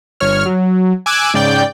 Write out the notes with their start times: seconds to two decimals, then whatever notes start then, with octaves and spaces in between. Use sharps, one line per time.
0.20 G1 C#5 F6
0.46 F#3
1.06 G#5 D6 E6 F#6 G#6
1.34 G#2 C#3 D5 G5 G6